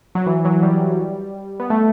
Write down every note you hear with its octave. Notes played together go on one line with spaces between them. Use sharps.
F#3
E3
F#3
G3
B3
A3